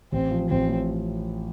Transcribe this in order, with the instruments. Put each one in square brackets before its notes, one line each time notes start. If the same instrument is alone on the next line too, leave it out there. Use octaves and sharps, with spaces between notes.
[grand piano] A1 [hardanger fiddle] C4
[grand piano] F3
[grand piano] A1 [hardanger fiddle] C4
[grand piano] A2